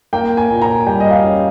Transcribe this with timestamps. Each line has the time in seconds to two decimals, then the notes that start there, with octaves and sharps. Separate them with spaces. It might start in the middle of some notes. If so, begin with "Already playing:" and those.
0.13 A#3 G5
0.37 G#5
0.50 A#2
0.62 A#5
0.86 G3 G5
1.00 D#5
1.11 F5
1.23 C#4